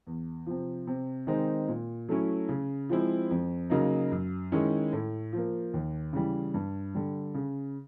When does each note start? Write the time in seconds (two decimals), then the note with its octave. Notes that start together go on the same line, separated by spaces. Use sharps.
0.07 E2
0.47 C3 F3
0.87 C3
1.27 D#3 G#3 C4 D#4
1.68 A#2
2.09 F#3 A3 C#4 E4
2.49 C#3
2.89 F3 G#3 C4 E4
3.31 F2
3.70 C#3 F#3 A#3 D#4
4.12 F#2
4.52 D#3 G#3 C#4 E4
4.93 A2
5.33 F3 A#3
5.74 D#2
6.13 C#3 E3 G3
6.54 G2
6.95 D3 G3
7.34 C#3